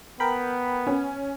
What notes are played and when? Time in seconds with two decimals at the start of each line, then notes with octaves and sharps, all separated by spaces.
0.20 B3 A#4 G5 B5
0.87 C#4